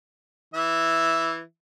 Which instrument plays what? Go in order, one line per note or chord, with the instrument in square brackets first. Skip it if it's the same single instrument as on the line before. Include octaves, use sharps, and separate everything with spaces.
[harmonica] E3 E5